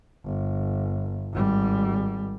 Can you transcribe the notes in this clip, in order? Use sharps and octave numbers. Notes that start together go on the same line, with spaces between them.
G1
G#1 G3